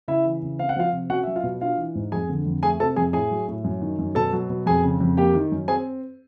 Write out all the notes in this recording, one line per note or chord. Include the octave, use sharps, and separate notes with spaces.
C#3 E4 E5
E3
C#3
C4 F5
F#5
F3 F4 F5
C3
C#4 F#4 F#5
F#3 E5
F4 F5
B2
D4 F4 F5
E3
G#2
F2 G#4 G#5
D3
F2
A3 G#4 G#5
C3 A4 A5
F2 G#4 G#5
A2 G#4 G#5
F#3
A2
F#2
D#3
F#2
B2 A4 A5
F#3
B2
F2 G#4 G#5
C#3
F2
A#3 G4 G5
D#3
F#2
C4 G#4 G#5